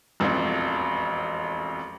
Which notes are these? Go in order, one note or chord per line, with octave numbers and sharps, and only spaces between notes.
E1 A1 F2